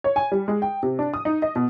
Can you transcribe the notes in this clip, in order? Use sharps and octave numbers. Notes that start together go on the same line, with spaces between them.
C#5
G#5
G3
G#3
G5
C3
D4
D#6
D#4
D#5
B2